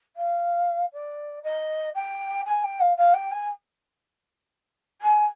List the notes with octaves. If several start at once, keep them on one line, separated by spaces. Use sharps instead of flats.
F5
D5
D#5
G5
G#5
G5
F5
F5
G5
G#5
G#5